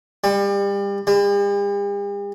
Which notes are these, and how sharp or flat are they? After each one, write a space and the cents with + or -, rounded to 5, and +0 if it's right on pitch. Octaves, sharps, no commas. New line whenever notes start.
G3 +30
G3 +45